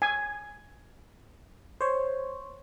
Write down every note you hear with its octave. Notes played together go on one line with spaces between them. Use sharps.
G#5
C5 C#5